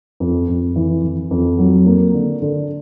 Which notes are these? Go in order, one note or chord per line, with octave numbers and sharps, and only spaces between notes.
F2
F2
E3
E3
F2
F#3
A#3
D3
D3